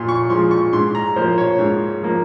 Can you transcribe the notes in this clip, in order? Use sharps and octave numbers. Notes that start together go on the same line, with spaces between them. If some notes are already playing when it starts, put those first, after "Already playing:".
Already playing: A#2 F3 C6
C#6
F3 G#3 C6
C#6
G#2 C6
A#5
F3 A#3 C5
C#5
G#2
F3 A#3